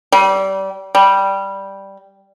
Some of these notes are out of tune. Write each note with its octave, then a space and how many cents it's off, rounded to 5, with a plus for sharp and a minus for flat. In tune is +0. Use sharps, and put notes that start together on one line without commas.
G3 -25
G3 -5